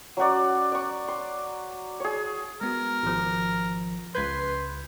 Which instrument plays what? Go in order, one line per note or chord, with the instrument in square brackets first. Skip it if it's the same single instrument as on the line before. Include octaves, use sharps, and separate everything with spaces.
[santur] F#3 C#4 F#4 D5
D5 C#6
C6
G#4 C#5
[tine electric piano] G#3 B3 F#4 [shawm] A#4
[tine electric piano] G#1 F3
[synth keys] C#2 B4 [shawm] C6 [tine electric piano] G6 G#6 B6